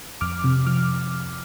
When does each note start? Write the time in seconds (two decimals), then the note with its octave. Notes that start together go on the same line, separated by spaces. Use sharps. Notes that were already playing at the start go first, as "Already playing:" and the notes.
0.21 F2 D6 F6
0.44 C3
0.66 F3 D6 F6